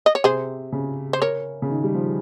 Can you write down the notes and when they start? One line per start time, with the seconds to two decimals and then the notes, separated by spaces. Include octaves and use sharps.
0.06 D#5
0.15 C#5
0.24 C3 G#4 C5
0.72 C#3
1.13 C5
1.22 A#4 C#5
1.62 C#3
1.70 D#3
1.84 G3
1.94 F3